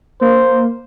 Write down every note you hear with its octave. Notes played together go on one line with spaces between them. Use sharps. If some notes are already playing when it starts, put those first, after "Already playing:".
A#3 C5